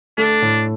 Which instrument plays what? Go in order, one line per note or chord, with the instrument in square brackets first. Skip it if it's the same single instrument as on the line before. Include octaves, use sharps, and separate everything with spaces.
[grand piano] A3 [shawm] D4
[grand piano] A2